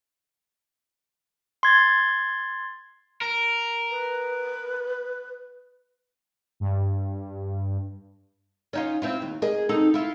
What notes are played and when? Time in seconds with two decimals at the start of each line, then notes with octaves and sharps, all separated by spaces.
1.63 C6 G#6 A6
3.21 A#4
3.91 B4
6.60 G2
8.73 C#4 D#4 F4
9.02 C4 E4 F4
9.22 D#2
9.42 G#4 A#4 D#5
9.69 C4 D#4 A4
9.94 E4 F4